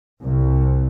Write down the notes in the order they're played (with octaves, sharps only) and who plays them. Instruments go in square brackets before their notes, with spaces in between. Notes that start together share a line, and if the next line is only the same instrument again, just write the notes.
[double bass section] C2